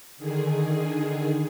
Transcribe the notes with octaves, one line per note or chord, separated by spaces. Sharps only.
D3 D#3 G#4